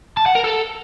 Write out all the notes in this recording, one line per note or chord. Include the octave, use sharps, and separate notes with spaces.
A5
F#5
A#4
A4